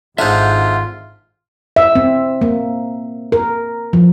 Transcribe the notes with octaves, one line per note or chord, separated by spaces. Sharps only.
G#1 G#2 D3 F4 E5 F#6 G6
E5
C4
A#3
A#4
F3